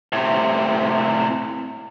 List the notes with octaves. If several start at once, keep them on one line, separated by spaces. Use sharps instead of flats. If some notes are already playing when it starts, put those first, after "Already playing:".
A2 C3